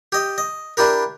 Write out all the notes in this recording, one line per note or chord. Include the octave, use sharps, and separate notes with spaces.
G4 D#5
D#5
D4 E4 G4 A#4